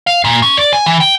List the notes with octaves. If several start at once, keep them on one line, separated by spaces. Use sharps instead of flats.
F5
A#2
C#4
D5
G#5
E3
G5